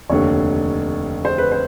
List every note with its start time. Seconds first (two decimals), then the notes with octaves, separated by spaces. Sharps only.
0.10 F1 D#2 D3 C#5
1.25 C5
1.38 B4
1.52 C5